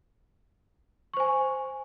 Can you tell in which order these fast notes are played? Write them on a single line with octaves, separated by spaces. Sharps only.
C#6 C5 G#5